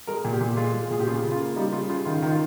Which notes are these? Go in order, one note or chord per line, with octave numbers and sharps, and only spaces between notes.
G#3 A#4
A#2
G4
A#2
G#3 F4
G#3
A#2 G#4
G4
C#3 F4
C#3
F4
A#3
G3 D#4
C#3 F4
C#3 F4
D#3 F4
D#3
F4